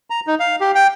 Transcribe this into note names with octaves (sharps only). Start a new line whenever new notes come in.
A#5
D#4
F5
G4
G5